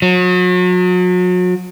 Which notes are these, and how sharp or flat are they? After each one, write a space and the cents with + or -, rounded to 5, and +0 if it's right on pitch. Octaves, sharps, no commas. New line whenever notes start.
F#3 -35